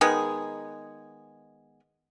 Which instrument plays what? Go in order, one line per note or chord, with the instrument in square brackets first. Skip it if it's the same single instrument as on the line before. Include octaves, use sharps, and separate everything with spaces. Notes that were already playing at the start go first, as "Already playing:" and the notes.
[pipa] D#3 G#3 B3 G#4